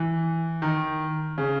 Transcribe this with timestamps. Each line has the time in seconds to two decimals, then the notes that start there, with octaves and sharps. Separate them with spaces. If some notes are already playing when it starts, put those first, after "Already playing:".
Already playing: E3
0.62 D#3
1.38 C#3